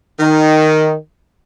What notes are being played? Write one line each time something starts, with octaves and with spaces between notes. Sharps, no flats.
D#3